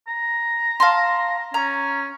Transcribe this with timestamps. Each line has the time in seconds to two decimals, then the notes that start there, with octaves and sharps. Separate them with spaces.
0.08 A#5
0.80 F5 A5 C6
1.54 C#4 A#5